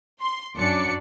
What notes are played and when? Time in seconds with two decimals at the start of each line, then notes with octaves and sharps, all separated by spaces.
0.21 C6
0.57 F#2 F#3 D4 D5 C#7